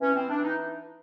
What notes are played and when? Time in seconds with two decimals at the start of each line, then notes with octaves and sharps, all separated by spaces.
0.01 E3 C#4
0.15 C4
0.30 E3 D4
0.43 D#4